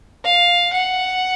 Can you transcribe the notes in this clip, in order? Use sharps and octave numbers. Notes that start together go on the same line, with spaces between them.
F5
F#5